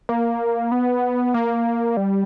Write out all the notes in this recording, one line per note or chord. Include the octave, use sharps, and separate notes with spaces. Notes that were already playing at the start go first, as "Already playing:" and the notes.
A#3
B3
A#3
G3